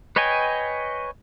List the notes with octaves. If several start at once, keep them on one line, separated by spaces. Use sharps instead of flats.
B4 C#5 D#5 G5 G#5